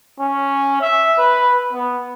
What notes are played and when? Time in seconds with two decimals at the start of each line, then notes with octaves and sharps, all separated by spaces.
0.19 C#4
0.82 E5
1.18 B4
1.73 B3